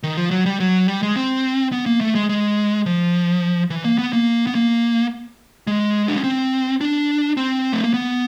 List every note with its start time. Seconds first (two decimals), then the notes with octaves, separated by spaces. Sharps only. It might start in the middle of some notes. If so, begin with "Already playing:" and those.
0.03 D#3
0.17 F3
0.31 F#3
0.46 G3
0.60 F#3
0.88 G3
1.03 G#3
1.16 C4
1.72 B3
1.86 A#3
2.01 A3
2.15 G#3
2.29 G#3
2.86 F3
3.70 E3
3.84 A#3
3.98 B3
4.13 A#3
4.47 B3
4.55 A#3
5.67 G#3
6.08 D4
6.16 C#4
6.24 C4
6.81 D4
7.37 C4
7.73 A3
7.84 A#3
7.94 B3